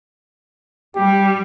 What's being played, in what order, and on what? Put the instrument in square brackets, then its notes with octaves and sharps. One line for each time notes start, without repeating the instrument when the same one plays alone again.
[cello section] G3 [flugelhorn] G4